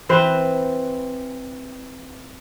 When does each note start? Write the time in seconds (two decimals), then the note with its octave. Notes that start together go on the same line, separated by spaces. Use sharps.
0.09 E3 C4 B4 C5